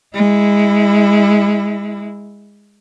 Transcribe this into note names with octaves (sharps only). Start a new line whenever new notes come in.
G#3 E4